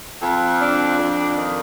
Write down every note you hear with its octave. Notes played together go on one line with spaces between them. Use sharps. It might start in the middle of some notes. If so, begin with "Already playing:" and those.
F2
D4
F2
D#3